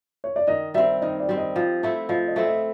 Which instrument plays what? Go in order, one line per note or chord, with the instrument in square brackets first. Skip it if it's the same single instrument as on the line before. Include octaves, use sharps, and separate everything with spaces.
[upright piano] C#5
D5
[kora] D#3 [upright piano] D#5
[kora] G3 C4 [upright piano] E5
[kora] D#3 [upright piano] D#5
[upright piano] D5
[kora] G3 C4
[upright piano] D#5
[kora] F3
A3 C4 E4
[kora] F3 [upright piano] D#5
[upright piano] D#5
[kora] A3 C4 E4
[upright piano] D#5